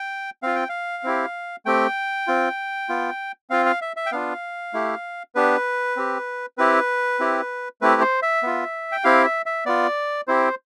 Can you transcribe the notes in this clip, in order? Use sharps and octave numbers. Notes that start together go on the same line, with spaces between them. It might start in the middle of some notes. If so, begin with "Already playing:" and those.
Already playing: G5
C4 F4 F5
G5
F5
C4 E4 G4
A3 C4 G4 G5
C4 F4
B3 F4
C4 F4 F5
F5
E5
E5
G5
B3 D4 F4 F5
A3 E4 G4
B3 D4 G4 B4
C4 G4
C4 E4 G4 B4
C4 E4 G4
A3 C4 E4 G4 B4
C5
E5
B3 F4
G5
C4 E4 G4 F5
E5
E5
B3 F4 D5
C4 E4 G4 C5